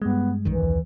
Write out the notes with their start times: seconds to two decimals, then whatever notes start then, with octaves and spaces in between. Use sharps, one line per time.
0.02 G2 G3 G#3 B3
0.45 B1 F#2 D#3 E3
0.60 D#2